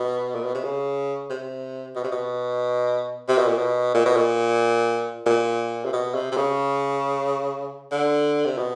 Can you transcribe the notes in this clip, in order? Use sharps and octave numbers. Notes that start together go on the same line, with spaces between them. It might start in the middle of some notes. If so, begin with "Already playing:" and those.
Already playing: B2
A#2
B2
C3
C#3
C3
B2
C3
B2
C3
B2
A#2
B2
A#2
B2
A#2
A#2
C3
B2
C3
C3
C#3
D3
C3
B2